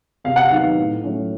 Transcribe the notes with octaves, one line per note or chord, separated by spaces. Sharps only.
C3 F5
F#5
D#3 F#3 B3 D#4 F5
A2
F#3 A3 C#4